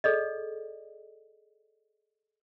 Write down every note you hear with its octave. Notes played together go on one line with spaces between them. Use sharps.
G#4 A4 D5 D#5